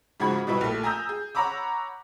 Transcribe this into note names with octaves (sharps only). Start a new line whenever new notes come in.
G#2 C#3 F3 F#4 B5 G#6
B2 G3 E4 B4
A#1 A3
G#5 A#5 D#6 E6 G6
G#4
C#5 F#5 A#5 B5 D6 E6